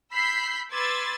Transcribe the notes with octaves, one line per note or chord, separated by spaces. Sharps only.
B5 E6 G6 B6 C7
B4 C6 D6 E6 G#6 A6